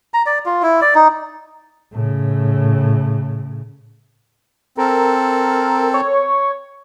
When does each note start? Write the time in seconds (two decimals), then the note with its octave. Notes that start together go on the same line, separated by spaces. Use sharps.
0.14 A#5
0.26 D5
0.46 F4
0.62 E4
0.82 D5
0.95 D#4
1.92 A2 C#3
4.78 C4 A4 A#4
5.94 C#5